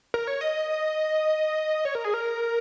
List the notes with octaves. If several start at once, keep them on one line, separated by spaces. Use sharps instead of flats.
A#4
C#5
D#5
C#5
A#4
G#4
A#4